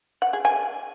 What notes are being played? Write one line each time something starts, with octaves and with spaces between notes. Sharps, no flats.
F#5
G#4
G#5